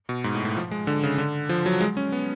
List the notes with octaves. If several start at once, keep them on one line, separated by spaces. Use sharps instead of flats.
B2
G#2
A2
A2
F3
G#3
D3
C#3
D3
F3
F#3
G#3
C#4
B3